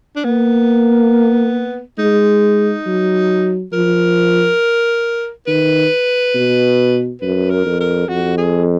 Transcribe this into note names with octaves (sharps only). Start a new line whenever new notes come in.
D4
A#3 B3
G#3 D#4
F#3
F3 A#4
D#3 B4
B2
F#2 B4
A#4
F2
A#4
F2 F#4
G#4